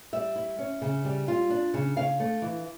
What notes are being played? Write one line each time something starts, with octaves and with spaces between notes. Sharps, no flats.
G3 E5
E4
C#4
C#3
G3
F4
D4
C#3
C#3 F5
A3
E3